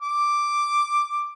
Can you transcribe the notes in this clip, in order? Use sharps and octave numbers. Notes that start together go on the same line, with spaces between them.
D6